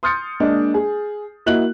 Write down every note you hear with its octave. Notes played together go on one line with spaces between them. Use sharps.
C6 D#6 F6 G6 A6 C#7
G#3 A#3 D4 D5 D#5
G#4
A#3 E4 F#4 D#5 F#6 F#7